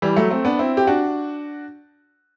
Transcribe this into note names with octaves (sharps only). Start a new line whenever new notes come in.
E3 G3
F#3 A3
A3 C4
B3 D4
C4 E4
G4
D4 F#4